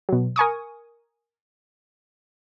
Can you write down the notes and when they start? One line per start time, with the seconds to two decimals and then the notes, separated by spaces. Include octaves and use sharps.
0.09 B2 F#3
0.36 A#4 G#5 C#6 D#6